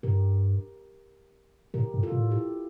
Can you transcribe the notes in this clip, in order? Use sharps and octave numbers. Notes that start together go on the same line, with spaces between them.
G2 G4 A#4
A2 G4 A#4
G2
F4 A4
A2
E4 G4